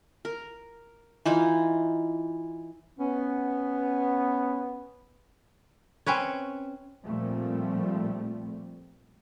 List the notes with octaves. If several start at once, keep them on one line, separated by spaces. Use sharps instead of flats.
A#4
E3 D#4 F4
B3 C#4
C4 C#4 B4 C#5
A#2 F3 G3 A3 C4